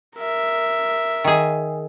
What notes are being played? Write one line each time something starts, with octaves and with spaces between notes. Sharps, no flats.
A#4 E5
D#3 G#4